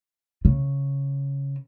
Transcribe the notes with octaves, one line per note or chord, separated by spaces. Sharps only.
C#3